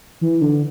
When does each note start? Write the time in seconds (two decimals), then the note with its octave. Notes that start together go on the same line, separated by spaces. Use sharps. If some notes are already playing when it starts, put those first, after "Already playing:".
0.21 E3
0.41 D3